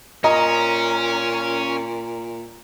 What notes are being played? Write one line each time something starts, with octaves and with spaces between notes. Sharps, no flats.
A#2 C#4 D#5 A#5